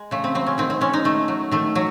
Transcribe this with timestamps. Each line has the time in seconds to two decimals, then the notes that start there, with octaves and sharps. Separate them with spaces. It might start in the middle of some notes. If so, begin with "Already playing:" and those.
Already playing: G#3
0.11 C#3 A3
0.24 C4
0.35 F#3 C4
0.47 C#4
0.58 D#3 C4
0.70 C4
0.81 G#3 C#4
0.93 D#4
1.04 D#3 A3
1.28 F#3
1.51 D#3 A3
1.75 F#3